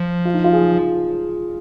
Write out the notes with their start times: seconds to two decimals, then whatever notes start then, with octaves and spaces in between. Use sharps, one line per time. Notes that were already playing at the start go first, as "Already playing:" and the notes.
Already playing: F3
0.25 F4
0.34 D#4
0.44 F4
0.53 G#4